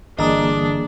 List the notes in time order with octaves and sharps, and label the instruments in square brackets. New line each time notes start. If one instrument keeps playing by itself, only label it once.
[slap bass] G1 [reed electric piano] E3 A#3 G#4 [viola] D4 [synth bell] D#5 A#5 D#6